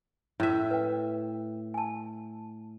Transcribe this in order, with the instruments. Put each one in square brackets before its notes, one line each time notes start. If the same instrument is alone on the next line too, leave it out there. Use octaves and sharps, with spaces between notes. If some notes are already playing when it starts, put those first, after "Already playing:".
[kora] A2 E5
[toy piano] B4 G5
G#5 A5